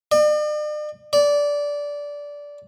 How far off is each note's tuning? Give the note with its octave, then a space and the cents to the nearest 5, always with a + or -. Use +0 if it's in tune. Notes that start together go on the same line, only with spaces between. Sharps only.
D5 +45
D5 -15